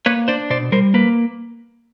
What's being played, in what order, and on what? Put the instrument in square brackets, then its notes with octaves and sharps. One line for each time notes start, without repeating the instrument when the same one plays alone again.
[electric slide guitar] A#3 B4 C#5
D4 C5 D5
B2 C5 D5
G3 A#4 C5
A#3 B4